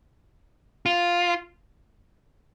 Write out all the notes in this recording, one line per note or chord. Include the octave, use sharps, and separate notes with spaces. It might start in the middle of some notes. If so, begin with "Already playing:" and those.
F4